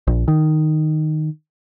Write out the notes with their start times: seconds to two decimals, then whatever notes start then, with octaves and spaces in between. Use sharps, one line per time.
0.07 A#1
0.28 D#3